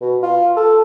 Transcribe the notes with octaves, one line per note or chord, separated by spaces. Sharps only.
B2
F4
A4